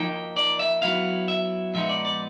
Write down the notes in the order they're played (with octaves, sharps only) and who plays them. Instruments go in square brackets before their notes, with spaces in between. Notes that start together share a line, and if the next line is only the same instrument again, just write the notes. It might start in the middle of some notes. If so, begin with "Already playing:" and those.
Already playing: [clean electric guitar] F3 A#3 D#4 G5
D5
E5
F#3 B3 E4 F5
E5
A#2 F3 G#3 B3 D#4 E5
D5
D5